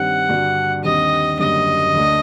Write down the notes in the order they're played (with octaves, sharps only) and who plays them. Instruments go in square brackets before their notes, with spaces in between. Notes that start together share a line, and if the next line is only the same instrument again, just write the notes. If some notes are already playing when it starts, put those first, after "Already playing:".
Already playing: [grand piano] G2 D#3 G3 C4 [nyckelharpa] F#5
[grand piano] G2 D3 G3 D4 F#4
[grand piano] D#2 D3 G3 C4 [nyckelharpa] D#5
[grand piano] F#1 F#2 D3 G3 [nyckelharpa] D#5
[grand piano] D2 D3 A3 D4